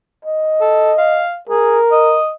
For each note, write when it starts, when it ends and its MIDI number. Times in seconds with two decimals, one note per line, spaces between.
0.25 1.24 75
0.61 0.92 69
0.98 1.38 77
1.49 1.78 68
1.49 2.19 70
1.92 2.32 75